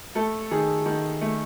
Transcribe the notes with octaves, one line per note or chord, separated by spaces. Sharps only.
A3 A4
D#3 G#4
D#3
A3